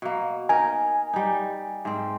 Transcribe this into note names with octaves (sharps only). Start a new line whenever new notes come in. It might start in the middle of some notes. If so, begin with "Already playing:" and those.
B2 A#3
D#4 A#4 G#5
G3 D#4
G#2 C4